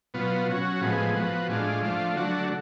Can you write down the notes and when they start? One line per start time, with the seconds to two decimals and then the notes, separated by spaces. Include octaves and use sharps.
0.14 B2 F#3 B3 F4
0.47 F#3 C#4 F#4
0.81 A2 F3 G#3 B3
1.14 F3 B3 F#4
1.48 A2 G#3 D4 F4
1.82 F3 A3 D4 F4
2.16 D3 F#3 A3 D4 F#4